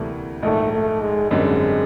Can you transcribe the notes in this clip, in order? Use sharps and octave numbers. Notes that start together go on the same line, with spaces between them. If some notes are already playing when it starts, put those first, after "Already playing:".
Already playing: D2 C3 E3 G3 A3 A#3
A#1 G#2 D#3 A3
A3
G#3
G#1 F#2 D3 G3 G#3 C4